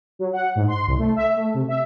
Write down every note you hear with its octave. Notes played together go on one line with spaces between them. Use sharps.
F#3
F#5
G#2
C6
C2
A3
E5
A3
C3
E5